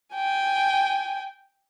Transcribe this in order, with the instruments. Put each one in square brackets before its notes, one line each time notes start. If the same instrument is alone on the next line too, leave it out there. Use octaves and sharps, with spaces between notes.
[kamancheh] G5 G#5